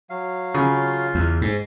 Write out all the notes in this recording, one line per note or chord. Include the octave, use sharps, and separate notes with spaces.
F#3 F5
C#3 F4
E2
G#2